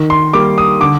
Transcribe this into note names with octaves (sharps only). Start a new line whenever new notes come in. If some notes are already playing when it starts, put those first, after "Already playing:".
Already playing: D#3
C6
G3 A#3 D6
D#6
D3 D6